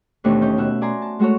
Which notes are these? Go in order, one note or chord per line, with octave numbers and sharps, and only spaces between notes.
D#2 B2 E3 A3 C4 D4
C#4 D#4 B4 G6
B2 F#4 E5 F#6
D5 G#5 A#5 C6
A5
G#3 A3 F#4 A4 C#5